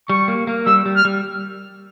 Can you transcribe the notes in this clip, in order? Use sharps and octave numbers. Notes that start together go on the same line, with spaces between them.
G3 C#6
A#3
A#3
G3 E6
G3
F6
G3